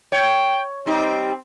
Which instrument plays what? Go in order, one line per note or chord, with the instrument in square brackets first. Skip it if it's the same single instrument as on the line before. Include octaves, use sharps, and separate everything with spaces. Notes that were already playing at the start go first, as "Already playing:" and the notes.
[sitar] C#5 [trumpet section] G5
[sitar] G3 D#4 G4 [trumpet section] C4